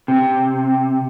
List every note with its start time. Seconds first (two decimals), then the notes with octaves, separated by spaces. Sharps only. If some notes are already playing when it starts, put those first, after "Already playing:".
0.08 C3